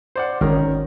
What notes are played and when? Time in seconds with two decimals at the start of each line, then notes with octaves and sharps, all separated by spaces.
0.16 C5 D5 F#5
0.41 G#1 D#3 C#4 A#4